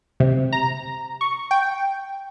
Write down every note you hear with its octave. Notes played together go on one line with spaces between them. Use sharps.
C3
A#5
C#6
G5